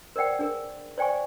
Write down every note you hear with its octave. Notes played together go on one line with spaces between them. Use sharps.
A#4 C5 D5 F#5 G5
D4 G#4 A#4
C5 D5 G5 G#5 C#6